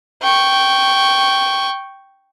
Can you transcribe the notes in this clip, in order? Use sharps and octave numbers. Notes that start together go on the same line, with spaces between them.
G5 C#6